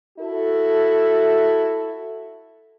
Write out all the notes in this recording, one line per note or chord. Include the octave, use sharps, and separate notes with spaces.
E4 F#4 A4